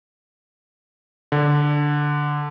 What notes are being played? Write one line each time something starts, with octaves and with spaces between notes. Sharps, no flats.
D3